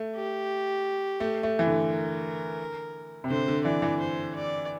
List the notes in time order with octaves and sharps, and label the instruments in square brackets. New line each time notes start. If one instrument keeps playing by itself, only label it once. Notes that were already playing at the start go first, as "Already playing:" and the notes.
Already playing: [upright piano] A3
[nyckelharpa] G4
[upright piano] A3
A3
E3
D3
[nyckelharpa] A#4
[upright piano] C3
[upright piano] D3 [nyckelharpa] C5
[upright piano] D3
[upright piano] E3 [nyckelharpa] D5
[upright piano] E3
[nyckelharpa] C5
D5